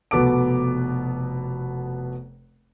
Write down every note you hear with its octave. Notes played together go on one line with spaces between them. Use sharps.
F1 B2 B3 A4 D6 D7